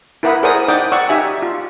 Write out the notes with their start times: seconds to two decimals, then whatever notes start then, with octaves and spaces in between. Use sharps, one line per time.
0.23 E4 A#4 B4 F#5 B5 D#6
0.43 G#4 A#4 C5 D5 F#5 D#6
0.68 D#4 D5 F#5 G5 D6 D#6
0.92 D5 F#5 C#6 E6
1.09 D#4 G4 E5 G#5
1.42 F4